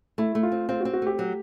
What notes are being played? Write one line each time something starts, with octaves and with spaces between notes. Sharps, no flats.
A3 E4
A3
F4
C4
C4 F4
F#4
C4
F#4
A3 G4
F#3